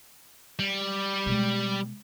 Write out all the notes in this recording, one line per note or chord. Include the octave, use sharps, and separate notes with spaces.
G3
B2 G#3